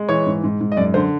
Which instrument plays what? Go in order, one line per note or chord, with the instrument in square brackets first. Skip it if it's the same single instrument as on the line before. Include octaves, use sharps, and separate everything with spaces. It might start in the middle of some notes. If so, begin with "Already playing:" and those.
Already playing: [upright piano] G#3
E3 C#5
G#2
G#2
G#2
D#5
F#2 D5
D3 C5